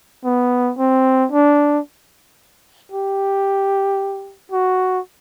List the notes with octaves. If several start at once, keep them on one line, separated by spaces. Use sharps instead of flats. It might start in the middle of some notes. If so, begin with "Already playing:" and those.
B3
C4
D4
G4
F#4